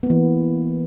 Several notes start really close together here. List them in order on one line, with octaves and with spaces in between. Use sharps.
B3 A#3 E3